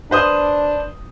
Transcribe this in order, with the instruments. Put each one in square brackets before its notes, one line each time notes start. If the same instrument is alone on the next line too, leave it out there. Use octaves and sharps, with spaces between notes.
[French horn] D4 [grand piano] B4 C5 D#6